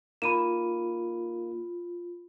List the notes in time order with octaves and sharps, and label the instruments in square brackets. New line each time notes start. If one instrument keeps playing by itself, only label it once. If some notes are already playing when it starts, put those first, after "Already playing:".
[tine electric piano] A#3 D#4 [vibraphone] F4 [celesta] B5 D#7 E7